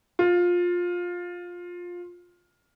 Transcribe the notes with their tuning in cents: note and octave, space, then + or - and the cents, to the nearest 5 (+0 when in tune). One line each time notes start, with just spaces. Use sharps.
F4 +15